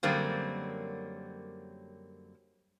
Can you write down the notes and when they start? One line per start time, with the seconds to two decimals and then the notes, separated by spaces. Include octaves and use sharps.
0.03 F#2 D3 F#3 G3 A#3 C4